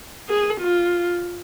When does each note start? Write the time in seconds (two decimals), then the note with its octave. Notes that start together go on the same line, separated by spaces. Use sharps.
0.29 G#4
0.61 F4